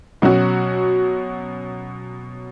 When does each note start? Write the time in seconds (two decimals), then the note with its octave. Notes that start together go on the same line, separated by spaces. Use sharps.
0.22 B2 F#3 C#4 F#4